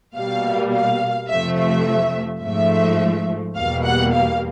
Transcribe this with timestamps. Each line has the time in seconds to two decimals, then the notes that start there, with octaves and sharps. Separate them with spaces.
0.15 B2 G3 A#3 F5
0.72 F5
1.28 F2 C3 F3 A3 E5
1.57 E5
2.42 G#2 F3 A3 E5
3.56 E2 B2 G3 A#3 F5
3.84 F#5
4.13 F5